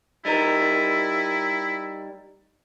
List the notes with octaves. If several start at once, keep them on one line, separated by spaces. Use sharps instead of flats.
G3 D#4 E4 A#4